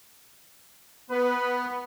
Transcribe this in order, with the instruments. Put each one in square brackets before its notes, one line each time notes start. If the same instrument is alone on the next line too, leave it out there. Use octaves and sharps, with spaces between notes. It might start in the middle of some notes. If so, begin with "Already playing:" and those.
[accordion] B3 [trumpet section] B4